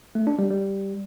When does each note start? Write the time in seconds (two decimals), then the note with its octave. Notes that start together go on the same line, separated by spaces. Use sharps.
0.15 A3
0.27 D4
0.39 G3
0.50 G3